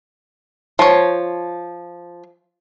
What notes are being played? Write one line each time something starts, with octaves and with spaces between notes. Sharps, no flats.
F3 C#5